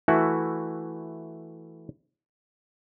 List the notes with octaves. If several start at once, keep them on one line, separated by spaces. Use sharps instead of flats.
E3 A3 E4 F#4